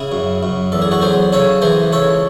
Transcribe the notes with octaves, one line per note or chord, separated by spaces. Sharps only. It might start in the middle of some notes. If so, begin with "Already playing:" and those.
Already playing: C#3 E4 G#4
F#2
F#2
E2 A4
G#4
F#4 A4
F#3 G#4 C5
C#3 A4 C#5
E3 G#4 C5
C#2 A4 C#5